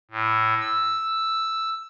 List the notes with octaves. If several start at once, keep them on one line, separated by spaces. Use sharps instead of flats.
A2
E6